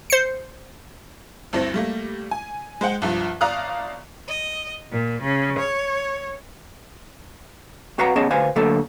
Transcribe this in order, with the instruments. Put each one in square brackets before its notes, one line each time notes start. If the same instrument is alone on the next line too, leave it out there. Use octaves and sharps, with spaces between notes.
[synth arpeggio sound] C5 C7 C#7
[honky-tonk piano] D2 G2 C4 E4 A#6
G3 A3 A#3
G#5
G#3 C5 F#5 G5
C2 G2 F3
G1 D5 F5 A#5 D#6 F#6
[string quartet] D#5
A#2
C#3
C#5
[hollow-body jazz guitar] C4 F#4 B4 F5 F#5 A#5
B3 C#4 G#4 D#5 A5
D2 B4 C5 F5 G#5
D3 F#3 A3 A#3 A4